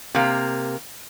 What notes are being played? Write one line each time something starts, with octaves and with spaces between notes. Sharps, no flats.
C3 A#3